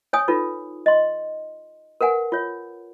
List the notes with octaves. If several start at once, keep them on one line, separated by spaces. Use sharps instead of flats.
C#5 G#5 D#6
D#4 F4 A4 B4
D#5 C6
A#4 B4 F#5 G#5
F4 C#5